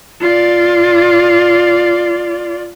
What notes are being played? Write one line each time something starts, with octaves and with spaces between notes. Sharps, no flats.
F4 D5